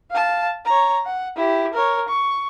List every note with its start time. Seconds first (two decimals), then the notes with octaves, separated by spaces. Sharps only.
0.10 F5 A5
0.65 C#5 A#5
1.06 F#5
1.36 E4 G4
1.73 A#4 C#5
2.08 C#6